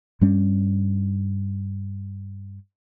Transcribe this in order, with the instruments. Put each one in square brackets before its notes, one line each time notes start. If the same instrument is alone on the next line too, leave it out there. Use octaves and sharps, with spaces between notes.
[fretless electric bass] G2 G3 C#4